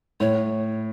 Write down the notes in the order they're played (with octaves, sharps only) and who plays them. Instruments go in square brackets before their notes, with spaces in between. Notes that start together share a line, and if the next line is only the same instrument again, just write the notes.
[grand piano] A2 [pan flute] C#5